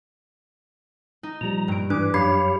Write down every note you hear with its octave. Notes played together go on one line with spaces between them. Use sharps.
D#4
A#2 F3 G3 A#5
G2 D7
G#2 E3 D4 B4 D6
F#2 G4 C#5 F5 B5